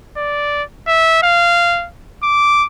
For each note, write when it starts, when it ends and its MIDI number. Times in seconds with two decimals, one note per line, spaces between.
0.17 0.63 74
0.87 1.22 76
1.23 1.87 77
2.23 2.65 86